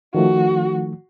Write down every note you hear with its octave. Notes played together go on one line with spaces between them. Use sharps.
D#3 F3 A3 F#4